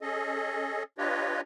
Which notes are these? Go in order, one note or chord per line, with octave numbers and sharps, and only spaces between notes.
C#4 G#4 A4 D#5
D4 F4 G4 B4 C#5 D#5